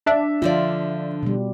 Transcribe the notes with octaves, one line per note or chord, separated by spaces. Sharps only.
D4 E5
D3 F3 F4 D5
B2 G3